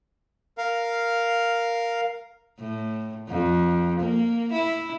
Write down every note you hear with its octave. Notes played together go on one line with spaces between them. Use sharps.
A#4 F5
A2
F2
A#3
E4